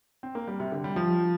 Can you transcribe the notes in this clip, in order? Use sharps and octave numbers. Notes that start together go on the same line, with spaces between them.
C4
A#3
G3
C3
D3
G3
F3